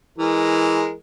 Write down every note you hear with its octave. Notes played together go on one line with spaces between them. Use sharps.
E3 G#3 A#4